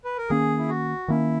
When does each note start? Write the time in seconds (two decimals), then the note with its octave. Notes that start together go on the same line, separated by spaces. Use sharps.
0.04 B4
0.18 A#4
0.30 D#3 A#3 C#4 G#4
0.58 E4
0.69 F#4
1.08 D#3 A#3 C#4 E4